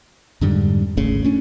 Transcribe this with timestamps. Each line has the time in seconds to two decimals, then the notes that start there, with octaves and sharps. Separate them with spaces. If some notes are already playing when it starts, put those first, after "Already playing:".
0.41 F2 G#2 D3 G3
0.97 D#1 G#1 C#3 A3
1.24 A3 C#4 D4